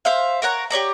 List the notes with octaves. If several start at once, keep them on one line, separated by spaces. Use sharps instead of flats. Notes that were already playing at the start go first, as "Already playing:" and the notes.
C5 E5 F5
A#4 C#5 F#5 A#5
G4 C#5 D5 A#5